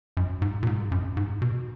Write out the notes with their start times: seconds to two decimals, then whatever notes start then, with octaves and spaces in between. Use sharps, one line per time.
0.17 F#2
0.42 G#2
0.63 A#2
0.67 G#2
0.92 F#2
1.17 G#2
1.42 B2